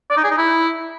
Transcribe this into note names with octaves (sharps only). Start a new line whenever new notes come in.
D5
D#4
G#4
D#4
E4